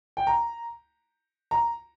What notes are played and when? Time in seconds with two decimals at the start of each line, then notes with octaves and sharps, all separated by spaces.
0.17 G5
0.27 A#5
1.51 A#5